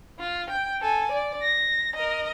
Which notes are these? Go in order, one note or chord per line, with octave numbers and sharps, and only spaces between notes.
F4
G5
A4 G#5
D5
A#6
A#4 D#5